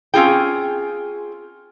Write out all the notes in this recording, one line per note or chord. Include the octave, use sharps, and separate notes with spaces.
C4 C#4 F4 G#4 G5